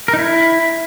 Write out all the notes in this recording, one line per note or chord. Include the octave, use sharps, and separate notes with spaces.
A#4
D#4
E4